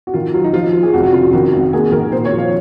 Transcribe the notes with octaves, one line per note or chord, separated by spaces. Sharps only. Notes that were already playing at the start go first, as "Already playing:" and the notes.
F#4
D#3 F4
F#3 F4
D#4
F3 F4
F3
G#4
F1 F#4
F#4
C#3 F4
D#3 F#4
G#1
A#3 G#4
D#3 A#4
A#2 C5
C#5
F3
F5